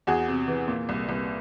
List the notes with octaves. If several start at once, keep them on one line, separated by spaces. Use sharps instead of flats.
E2 F#4 G#4
C3
E3
A#2
C2
C2